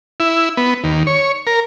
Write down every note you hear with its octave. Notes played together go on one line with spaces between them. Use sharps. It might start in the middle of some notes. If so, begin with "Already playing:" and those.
E4
B3
D#2
C#5
A#4